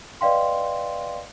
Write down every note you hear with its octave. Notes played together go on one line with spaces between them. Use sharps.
B4 D5 D#5 F5 G5 C6